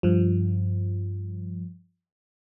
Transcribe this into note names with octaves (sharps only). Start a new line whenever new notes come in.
G2 F3